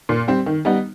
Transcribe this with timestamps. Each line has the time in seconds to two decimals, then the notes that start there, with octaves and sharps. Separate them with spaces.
0.09 A#2
0.28 G3 C4
0.46 D#3
0.65 G3 B3 D#4